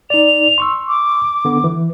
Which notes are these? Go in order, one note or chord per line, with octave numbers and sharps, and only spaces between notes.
D#4 D5 F7
C6 C#6 E6
D6
D3 B3
E3